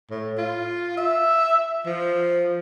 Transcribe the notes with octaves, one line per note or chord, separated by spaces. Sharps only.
A2
F4
E5
F3